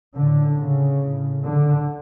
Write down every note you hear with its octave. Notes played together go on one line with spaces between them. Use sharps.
A2 D3
C#3
A2
D3